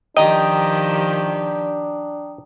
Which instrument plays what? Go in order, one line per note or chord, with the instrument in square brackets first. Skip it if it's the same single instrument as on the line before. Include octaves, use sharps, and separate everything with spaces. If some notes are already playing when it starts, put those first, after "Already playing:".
[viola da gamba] D#3 F3 G4 [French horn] D4 [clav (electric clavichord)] D#5 [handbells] G5 A#5 D#6